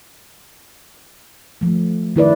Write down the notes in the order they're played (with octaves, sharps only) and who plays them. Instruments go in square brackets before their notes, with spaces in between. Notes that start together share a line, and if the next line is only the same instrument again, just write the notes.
[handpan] F3 A3
D#3 E4 B4 D5